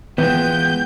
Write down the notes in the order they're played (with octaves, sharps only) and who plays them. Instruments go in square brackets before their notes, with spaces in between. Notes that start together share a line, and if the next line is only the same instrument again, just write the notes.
[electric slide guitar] E3 F3 G#3 [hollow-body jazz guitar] B3 [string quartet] G5 [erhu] G6